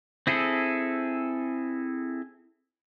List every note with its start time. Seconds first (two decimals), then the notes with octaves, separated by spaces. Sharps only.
0.27 C4 E4 G#4 A4